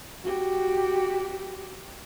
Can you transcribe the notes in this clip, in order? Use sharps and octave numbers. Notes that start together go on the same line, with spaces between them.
F#4 G4